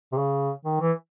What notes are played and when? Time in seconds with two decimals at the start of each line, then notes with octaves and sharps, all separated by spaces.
0.12 C3
0.18 C#3
0.65 D#3
0.81 E3